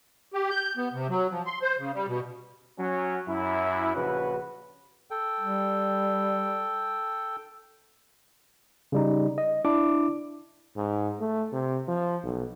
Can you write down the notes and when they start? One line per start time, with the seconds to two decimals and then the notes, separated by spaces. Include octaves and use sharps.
0.34 G4
0.50 G6
0.77 B3
0.93 C3
1.09 F#3
1.30 F3
1.46 C6
1.62 C5
1.79 C#3
1.94 G3
2.08 B2
2.79 F#3 C#4
3.28 F#2 E4
3.95 A#1 C#3 F#4 B4
5.11 A4 G5
5.41 G3
8.92 C#3 G3 D#4
9.38 D#5
9.65 D4 E4 D6
10.76 G#2
11.20 A3
11.53 C3
11.88 F3
12.24 B1